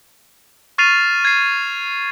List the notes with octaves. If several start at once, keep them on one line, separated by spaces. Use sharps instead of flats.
C#6 F6 A6 C7 D#7 F7
G#6 C7